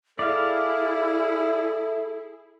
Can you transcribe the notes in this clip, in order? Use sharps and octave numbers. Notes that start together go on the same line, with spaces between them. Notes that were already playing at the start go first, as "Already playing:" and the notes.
E4 G#4 A4 D5 E5 F5